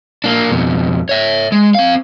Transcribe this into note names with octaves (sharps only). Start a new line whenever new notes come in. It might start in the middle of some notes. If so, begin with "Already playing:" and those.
A#3 D4
F2 B2
C#5 E5
G#3
C4 F5